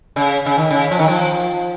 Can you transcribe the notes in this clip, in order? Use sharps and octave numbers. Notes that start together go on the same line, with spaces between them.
C#3
C#3
D#3
C#3
F3
D#3
F3